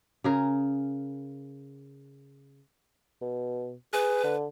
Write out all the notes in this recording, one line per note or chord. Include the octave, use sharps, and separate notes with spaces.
C#3 G#4 A#4
B2
G#4 B4
D3